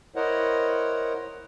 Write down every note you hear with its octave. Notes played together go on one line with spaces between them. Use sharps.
E4 A#4 C5 C#5 D#5 F#5